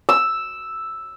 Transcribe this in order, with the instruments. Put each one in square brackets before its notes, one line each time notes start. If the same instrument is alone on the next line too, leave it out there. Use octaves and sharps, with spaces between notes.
[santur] E6